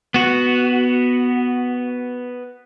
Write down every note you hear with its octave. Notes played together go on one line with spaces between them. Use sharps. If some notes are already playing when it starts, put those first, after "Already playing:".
B3 F#4